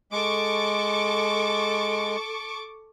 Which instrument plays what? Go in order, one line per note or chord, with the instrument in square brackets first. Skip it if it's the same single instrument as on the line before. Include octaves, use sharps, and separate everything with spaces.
[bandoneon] G#3 [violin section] A4 C#6 D6